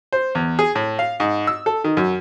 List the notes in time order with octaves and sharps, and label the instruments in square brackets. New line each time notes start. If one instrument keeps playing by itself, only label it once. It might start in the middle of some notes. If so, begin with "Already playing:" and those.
[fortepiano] C5
E2
G#4
A2
F5
G#2
E6
A4
D#3
F#2